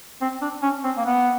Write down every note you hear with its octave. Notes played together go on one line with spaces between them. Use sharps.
C4
D4
C#4
C4
A#3
B3